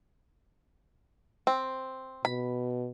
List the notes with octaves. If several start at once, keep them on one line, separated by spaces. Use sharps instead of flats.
C4
B2 B5